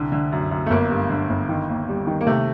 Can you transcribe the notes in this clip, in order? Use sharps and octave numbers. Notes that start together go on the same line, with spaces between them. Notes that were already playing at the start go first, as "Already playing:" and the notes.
Already playing: C2 D3
D3
F#2
F#2
A3
G1 A#3
G2
D3
G1
D#3
D#2
G3
D#3
A#3
C3 A3